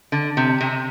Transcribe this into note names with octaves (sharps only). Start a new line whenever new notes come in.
D3
C3
C3